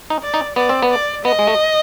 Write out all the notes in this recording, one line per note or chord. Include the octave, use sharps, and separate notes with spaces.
D#4
D5
D#4
B3 D5
C4
B3
D5
B3 D#5
G#3
A3